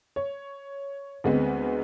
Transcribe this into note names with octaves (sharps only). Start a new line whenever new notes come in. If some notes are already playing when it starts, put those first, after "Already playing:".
C#5
D2 G#3 B3 C4